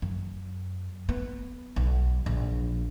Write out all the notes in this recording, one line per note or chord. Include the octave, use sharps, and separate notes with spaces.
F#2
B3
B1
A#1